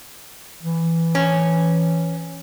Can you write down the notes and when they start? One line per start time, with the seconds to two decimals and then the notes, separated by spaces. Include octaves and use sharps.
0.63 E3
1.15 C#4